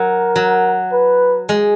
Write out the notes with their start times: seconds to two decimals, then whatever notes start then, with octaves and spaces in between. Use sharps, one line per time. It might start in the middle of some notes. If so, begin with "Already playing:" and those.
Already playing: F#3 A#4
0.36 F#3
0.92 B4
1.49 G#3